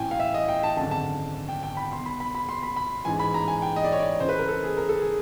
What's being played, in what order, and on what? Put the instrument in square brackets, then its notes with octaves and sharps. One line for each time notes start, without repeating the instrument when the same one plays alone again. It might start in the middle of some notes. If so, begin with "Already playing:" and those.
Already playing: [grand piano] A1 A2 E3 G5 G#5
F5
E5
D#5
G5
A5
G#1 F#2 D3 A5
A5
G5
G5
B5
B1 B2 C6
B5
B5
B5
C6
B5
B5
A1 G#2 E3 G#5
B5
A#5
G#5
G5
D#5
D5
C#5
D5
C#2 C#3 E3 C5
B4
A#4
A4
G#4
A#4
A4
G#4